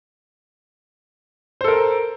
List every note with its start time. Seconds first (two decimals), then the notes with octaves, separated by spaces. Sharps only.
1.61 C5
1.64 A4
1.68 A#4